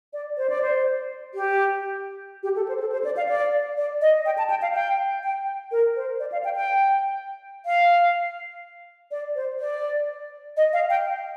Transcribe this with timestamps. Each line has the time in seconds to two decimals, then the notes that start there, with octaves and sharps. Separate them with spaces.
0.13 D5
0.37 C5
0.50 D5
0.62 C5
1.35 G4
2.43 G4
2.56 A4
2.68 C5
2.80 A4
2.92 C5
3.04 D5
3.17 F5
3.28 D5
3.77 D5
4.01 D#5
4.26 G5
4.38 A5
4.50 G5
4.62 F5
4.74 G5
5.23 G5
5.72 A#4
5.96 C5
6.20 D5
6.32 F5
6.44 G5
6.56 G5
7.66 F5
9.11 D5
9.35 C5
9.60 D5
10.57 D#5
10.73 F5
10.90 G5